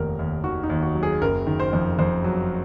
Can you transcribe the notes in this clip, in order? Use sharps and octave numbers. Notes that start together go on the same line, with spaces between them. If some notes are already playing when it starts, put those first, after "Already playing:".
Already playing: F1 D#2 A#4
D#2
D#3 F#4
D#4
D#2
F#4
F#3
G#4
F#1 A#4
D#3
C5
F2
F2 C5
F#3